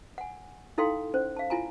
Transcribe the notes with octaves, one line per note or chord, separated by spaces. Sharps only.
F#5 G#5
D#4 E4 A4 F5 G5 C6
C#4 C5
F5 A5
E4 F4 G#5 A#5